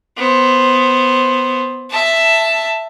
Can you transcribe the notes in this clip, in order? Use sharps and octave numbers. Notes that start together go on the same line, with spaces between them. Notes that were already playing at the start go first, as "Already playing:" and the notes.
B3 C5
E5 A5